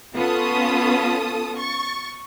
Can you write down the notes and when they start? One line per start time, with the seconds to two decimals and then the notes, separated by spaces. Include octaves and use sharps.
0.15 B3 C#4 F4 A4 D#6
1.58 C#6 A6